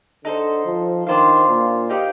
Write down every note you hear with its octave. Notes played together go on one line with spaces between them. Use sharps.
D3 D#4 A4 C5
F3
D#3 D4 F4 C5 F5
A#2
D#4 G4 D5 F5